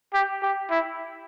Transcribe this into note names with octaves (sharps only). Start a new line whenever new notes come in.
G4
G4
E4